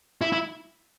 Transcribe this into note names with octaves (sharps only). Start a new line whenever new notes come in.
E4
E4